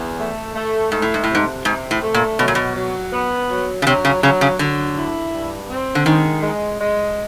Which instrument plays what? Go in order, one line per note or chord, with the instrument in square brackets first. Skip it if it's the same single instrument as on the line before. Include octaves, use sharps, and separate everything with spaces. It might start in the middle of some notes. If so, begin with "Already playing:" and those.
Already playing: [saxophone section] E2
A3
A3
[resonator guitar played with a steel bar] G#2 [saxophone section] A3
[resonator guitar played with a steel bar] A2
G#2
A2
[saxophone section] C3
[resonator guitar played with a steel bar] G#2
[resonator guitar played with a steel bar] G#2 [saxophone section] C3
[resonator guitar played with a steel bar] A2
[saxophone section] A3
[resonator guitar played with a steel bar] A#2
[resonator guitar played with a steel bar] B2 [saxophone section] F#3
[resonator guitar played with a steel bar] A#2
B2
[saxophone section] F#3
B3
F#3
[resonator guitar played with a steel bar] C#3
[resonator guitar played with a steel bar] C3 [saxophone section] F#3
[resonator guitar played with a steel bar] C#3
[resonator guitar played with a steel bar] C#3 [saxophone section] F#3
[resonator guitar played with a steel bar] C#3
[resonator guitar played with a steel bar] D3 [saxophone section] F#3
[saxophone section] E4
G2
C4
[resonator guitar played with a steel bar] D3
[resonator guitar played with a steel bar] D#3 [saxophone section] G#3
[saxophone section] G#3
G#3